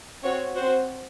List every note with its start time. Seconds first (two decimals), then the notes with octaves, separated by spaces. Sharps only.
0.23 C4 F#4 C#5
0.56 C4 F#4 C5